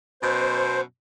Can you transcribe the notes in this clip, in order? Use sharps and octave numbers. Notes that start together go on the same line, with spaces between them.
F#2 B2 C5